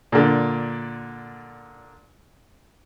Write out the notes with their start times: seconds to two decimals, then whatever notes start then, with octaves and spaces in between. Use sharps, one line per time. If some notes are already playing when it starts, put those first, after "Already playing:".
0.12 A#2 D3